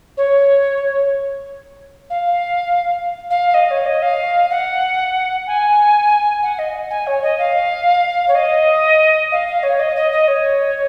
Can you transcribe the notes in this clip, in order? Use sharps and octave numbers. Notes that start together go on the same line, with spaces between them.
C#5
F5
F5
D#5
C#5
D#5
F5
F#5
G#5
F#5
D#5
G#5
C#5
D#5
F5
C#5
D#5
F5
F5
C#5
D#5
D#5
D#5
C#5